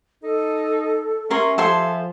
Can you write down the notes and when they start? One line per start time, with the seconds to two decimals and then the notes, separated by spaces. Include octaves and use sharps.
0.23 D#4 A4
1.31 C#4 A#4 E5 C6
1.58 F3 A4 G#5 C6